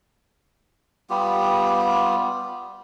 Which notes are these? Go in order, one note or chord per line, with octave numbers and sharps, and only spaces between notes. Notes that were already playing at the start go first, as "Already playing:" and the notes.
G3 B3 F4 G4